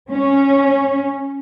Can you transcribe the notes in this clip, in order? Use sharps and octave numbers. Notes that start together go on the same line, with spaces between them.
C#4